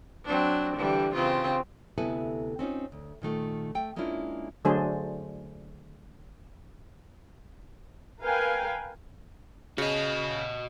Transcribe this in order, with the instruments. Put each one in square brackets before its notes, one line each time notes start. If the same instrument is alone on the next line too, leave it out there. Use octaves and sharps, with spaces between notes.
[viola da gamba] F#3 C4 D4
D3 E3 G3
C#3 C4 F4
[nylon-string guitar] D2 C3 B3 E4 A4 G#5
C4 C#4 D#4 F4
D2
A#2 D#3 A3 F4
A3 G5
G#3 A#3 C#4 D4 E4 F4
[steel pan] D3 F#3 A3 D4 G#4 C5
[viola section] A#4 B4 F5 G5 G#5
[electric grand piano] C#3 [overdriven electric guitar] F#4 D#5